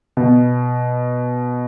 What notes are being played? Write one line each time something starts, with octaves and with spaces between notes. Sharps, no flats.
B2